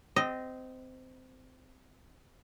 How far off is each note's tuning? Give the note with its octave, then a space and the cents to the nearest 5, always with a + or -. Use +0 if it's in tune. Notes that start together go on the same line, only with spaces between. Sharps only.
C4 -20 D#5 +0